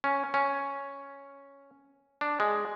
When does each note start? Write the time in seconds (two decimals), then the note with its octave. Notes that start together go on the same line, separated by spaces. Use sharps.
0.04 C#4
0.34 C#4
2.21 D4
2.40 G#3